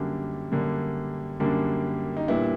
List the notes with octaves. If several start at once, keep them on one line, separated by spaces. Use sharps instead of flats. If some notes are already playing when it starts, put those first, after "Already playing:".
Already playing: F#2 D3 G3 A#3 D4
F#2 D3 G3 A#3 D4
F#2 D3 G3 A#3 D4
D#4
A#2 G3 B3 D4 E4